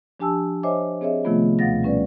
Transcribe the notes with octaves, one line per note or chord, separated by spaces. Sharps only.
F3 D4 G4 G#5 A5 E6
C5 C#5 D#5 E5 G#5 D6
C4 G#4 C#5 D#5 E5
C3 D#3 F3 A3 B3 F4
D2 B2 F5 F#5 A6 A#6
G3 C#4 B4 D5